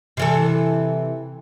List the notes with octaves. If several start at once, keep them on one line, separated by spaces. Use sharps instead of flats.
C3 E3 A4